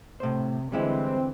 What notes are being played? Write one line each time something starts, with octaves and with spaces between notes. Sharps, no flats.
A2 C3 C5
D3 E3 G3 G#3 C4 E4